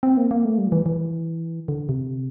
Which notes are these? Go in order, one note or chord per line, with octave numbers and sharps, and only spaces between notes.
C4
A#3
A#3
A3
G3
F3
E3
E3
D3
C3